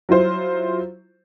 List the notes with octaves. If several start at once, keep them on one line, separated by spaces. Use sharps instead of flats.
F#3 E4 F4 C5